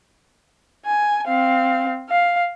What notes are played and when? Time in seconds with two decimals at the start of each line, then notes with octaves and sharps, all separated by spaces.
0.85 G#5
1.27 C4 F5
2.09 F5